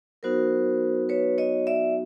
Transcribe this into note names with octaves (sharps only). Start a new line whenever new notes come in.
F#3 B3 D#4 F#4 A#4 C5
B4 C#5
C#5 D#5
D5 E5